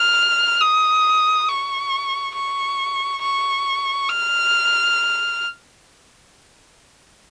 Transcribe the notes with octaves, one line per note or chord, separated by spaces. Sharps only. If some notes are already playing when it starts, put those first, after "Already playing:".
Already playing: F6
D#6
C#6
C#6
C#6
F6